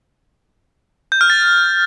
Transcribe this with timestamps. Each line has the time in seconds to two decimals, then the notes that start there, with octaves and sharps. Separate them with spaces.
1.12 G6
1.21 F6
1.30 A6